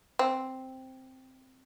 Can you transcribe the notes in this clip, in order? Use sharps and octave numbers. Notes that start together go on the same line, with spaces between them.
C4